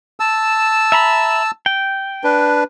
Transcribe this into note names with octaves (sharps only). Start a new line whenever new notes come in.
A5 E6
E5 A#5 B5
G5
D4 B4